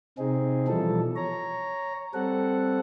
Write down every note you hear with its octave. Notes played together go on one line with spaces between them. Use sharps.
C3 C4 D#4 G#4
B2 E3 F3 G3 A4
C#5 A#5
G3 C4 A4 F#5